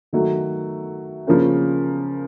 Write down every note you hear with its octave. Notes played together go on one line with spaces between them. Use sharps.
D#3 F#3 A3
C#3 F3 A#3 C#4